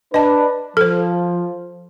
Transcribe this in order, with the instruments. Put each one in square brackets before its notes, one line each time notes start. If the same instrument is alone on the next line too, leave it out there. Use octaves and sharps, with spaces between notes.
[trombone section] D4 B4 [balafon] D#5 A5
[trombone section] F3 [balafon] A4 C5